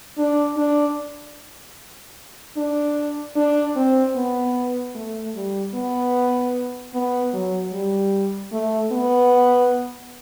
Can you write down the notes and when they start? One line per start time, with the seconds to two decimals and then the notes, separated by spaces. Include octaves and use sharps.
0.18 D4
0.57 D4
2.57 D4
3.36 D4
3.76 C4
4.16 B3
4.95 A3
5.35 G3
5.74 B3
6.94 B3
7.33 F#3
7.72 G3
8.52 A3
8.92 B3